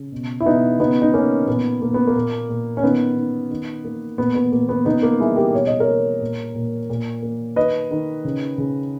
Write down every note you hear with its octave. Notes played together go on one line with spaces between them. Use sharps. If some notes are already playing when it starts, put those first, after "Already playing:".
Already playing: C#3
B2
E4
B2 B3 D#4
C#3 B3 D#4
D#4
A#3 C#4
A#2 B3
A#2 A#3
B3
A#3
A#2
A#2
C#4
D#3 B3
D#3
D#3
A#3
A#2 B3
B3
A#2 A#3
B3
C#3 B3 D#4
A#3
G3 E4 G#4
G4 A#4
B2 C#5
D#5
A#4 C#5
A#3
A#2
A#2
A#2
A#3
D#3 B4 D#5
D#3
C#3
C#3